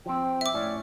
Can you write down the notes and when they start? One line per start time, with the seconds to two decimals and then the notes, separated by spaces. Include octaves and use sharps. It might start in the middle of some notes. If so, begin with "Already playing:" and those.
0.06 F3 C4 G5
0.41 E5 D6
0.54 A2 C#4 D5